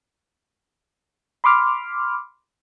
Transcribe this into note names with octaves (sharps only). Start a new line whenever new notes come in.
B5 C6 D6 F6